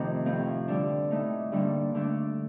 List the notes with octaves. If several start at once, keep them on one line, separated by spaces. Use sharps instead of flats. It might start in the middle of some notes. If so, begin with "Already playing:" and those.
Already playing: F2 C3 D#3 A3
A2 F3 C4
D3 G3 D4
A2 A3 D#4
G2 D3 G3 A#3 D4
D3 A3 D4